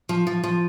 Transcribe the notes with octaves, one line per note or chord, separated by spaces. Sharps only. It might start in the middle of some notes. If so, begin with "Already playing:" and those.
F3
F3
F3